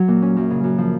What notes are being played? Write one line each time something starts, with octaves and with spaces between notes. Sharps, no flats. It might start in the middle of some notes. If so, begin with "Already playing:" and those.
Already playing: F#3
A#2
C#4
F#2
C#3
F#2
F3